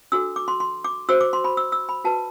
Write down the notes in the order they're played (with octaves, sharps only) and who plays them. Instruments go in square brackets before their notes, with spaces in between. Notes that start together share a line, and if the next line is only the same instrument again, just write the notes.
[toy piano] D4 F#4 A4 E6
D6
C6
C6
D6
F#4 C5 E6
D6
C6
B5
E6
E6
B5
F#4 B4 A5